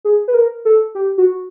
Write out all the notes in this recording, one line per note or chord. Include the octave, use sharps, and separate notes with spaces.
G#4
B4
A#4
A4
G4
F#4